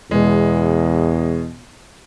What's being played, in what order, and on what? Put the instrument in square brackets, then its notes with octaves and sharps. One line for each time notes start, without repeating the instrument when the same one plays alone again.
[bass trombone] E2 [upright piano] B2 G#3